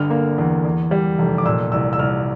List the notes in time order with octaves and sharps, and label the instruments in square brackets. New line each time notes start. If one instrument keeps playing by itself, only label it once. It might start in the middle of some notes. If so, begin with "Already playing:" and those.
Already playing: [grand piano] G1 D3 F6
A#3
E2
E2
G3
F1
D6
A#2 E6
C2 E6
E6
C2 F6